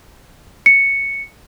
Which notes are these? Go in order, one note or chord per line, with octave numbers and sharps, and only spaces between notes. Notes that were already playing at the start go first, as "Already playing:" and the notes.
C#7